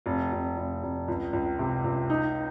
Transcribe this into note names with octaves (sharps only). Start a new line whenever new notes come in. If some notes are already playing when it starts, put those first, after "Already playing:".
F1
F1
F1
F1
C#2
C#2
C3
C#2
D#4